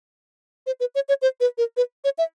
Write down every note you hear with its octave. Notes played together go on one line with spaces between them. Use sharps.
C5
B4
C#5
C#5
C5
B4
A#4
B4
C#5
E5